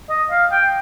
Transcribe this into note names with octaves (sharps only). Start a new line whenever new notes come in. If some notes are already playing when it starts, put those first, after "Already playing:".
D#5
F5
G5